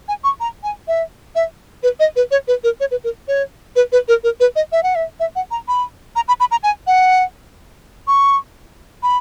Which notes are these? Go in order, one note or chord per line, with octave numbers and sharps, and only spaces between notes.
G#5
C#6
A#5
G#5
E5
E5
B4
D#5
B4
C#5
B4
A#4
C#5
B4
A#4
C#5
B4
B4
A#4
A#4
B4
D#5
E5
F#5
E5
E5
F#5
A#5
B5
A#5
B5
B5
A#5
G#5
F#5
C#6
B5